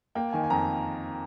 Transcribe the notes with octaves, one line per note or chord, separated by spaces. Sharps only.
A#3 G5
D#3 G#5
G#5
F2 A#5